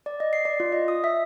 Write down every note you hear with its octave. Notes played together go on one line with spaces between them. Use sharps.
D5
D#5
C7
D5
F4
D#5
D#6
E5